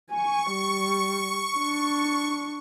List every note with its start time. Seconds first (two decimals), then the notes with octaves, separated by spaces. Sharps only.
0.11 G#5 C#6
0.51 G3
1.57 D4